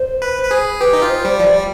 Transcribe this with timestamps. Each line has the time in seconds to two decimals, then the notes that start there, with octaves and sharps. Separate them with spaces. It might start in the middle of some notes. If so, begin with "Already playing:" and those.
Already playing: C5
0.22 B4
0.43 B4
0.51 G#4
0.80 G4 B4
0.93 D#4
1.02 F4
1.09 C5
1.25 G3
1.38 F3 D5
1.46 G3